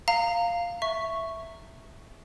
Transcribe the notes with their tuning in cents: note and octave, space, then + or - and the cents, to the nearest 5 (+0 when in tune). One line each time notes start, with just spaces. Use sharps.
F5 +0 A#5 -20
E5 +0 C#6 +0